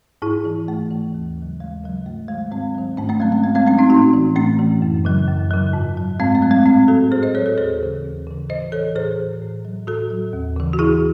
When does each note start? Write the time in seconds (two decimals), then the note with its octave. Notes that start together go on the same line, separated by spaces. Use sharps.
0.22 G#2 E4 G#4
0.45 E3
0.68 G#2 A3
0.90 E3
1.14 D#2
1.37 C#3 F#3
1.60 D#2 G#3
1.83 C#3 F#3
2.06 G#2 A3
2.28 D#3 F#3 G#3
2.52 G#2 G#3 C4
2.75 D#3 F#3
2.97 G#2 A3 C#4
3.09 A3 C#4
3.20 F#3 G#3 C4
3.32 A3 C#4
3.43 G#2 G#3
3.55 G#3 C4
3.67 F#3 A3 C#4
3.78 C4 D#4
3.90 A2 D#4 F#4
4.13 E3
4.36 A2 A3 C#4
4.59 E3
4.82 F#2
5.05 C#3 F#3
5.28 F#2
5.51 C#3 F#3
5.73 G#2
5.97 F#3
6.20 G#2 G#3 C4
6.35 A3
6.42 F#3
6.51 G#3 C4
6.66 A2 G#3 C4
6.88 F#3 F#4 A4
7.11 A2 G#4 C5
7.23 C5 D#5
7.35 F#3 A4 C#5
7.46 F#4 A4
7.58 D#2 G#4 C5
7.81 C#3 E3
8.04 D#2
8.26 C#3 E3
8.49 A2 C5 D#5
8.72 E3 A4 C#5
8.96 A2 G#4 C5
9.19 E3
9.41 A2
9.65 F#3
9.87 A2 F#4 A4
10.10 F#3
10.33 D#2
10.56 C#3 E3
10.73 F#4
10.79 D#2 E4 G#4